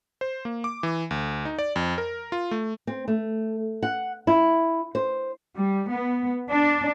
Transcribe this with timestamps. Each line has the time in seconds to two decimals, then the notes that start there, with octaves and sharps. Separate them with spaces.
0.21 C5
0.45 A#3
0.64 D6
0.83 E3
1.11 D2
1.45 D#4
1.59 D5
1.76 F2
1.98 A#4
2.32 F4
2.51 A3
2.87 C4
3.08 A3
3.83 F#5
4.27 E4
4.95 C5
5.56 G3
5.90 B3
6.50 D4